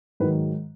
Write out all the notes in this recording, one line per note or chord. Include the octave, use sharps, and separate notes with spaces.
G#2 D#3 F#3 B4